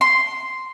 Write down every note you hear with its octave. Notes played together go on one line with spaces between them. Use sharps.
C6